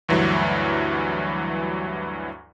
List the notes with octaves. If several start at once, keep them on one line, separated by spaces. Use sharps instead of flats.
D2 G2 E3 F#3